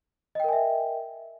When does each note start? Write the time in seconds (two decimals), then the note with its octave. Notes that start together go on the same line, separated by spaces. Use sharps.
0.35 D#5
0.40 G5
0.44 A#4
0.48 G#5
0.53 E5